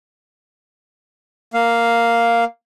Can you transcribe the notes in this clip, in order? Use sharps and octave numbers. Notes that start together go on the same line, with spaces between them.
A#3 F5